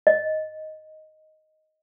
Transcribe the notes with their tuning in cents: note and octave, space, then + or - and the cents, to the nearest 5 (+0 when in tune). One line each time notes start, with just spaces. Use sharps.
D#5 +5